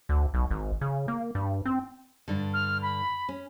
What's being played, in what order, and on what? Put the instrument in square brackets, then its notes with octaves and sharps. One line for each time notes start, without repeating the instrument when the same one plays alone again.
[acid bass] D2
B1
G#1
C#3
A#3
G2
C4
[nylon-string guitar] G2 D3
[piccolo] F6
B5
[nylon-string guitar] C#4